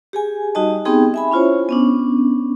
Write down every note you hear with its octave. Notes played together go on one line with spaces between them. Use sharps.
G4 G#4 G#5
G3 D#4 F#4 G4 D#5 A5
B3 C4 D#4 G4 G#4 G5
E5 G#5 B5
C#4 E4 F4 C5 C#5
B3 C#4 D4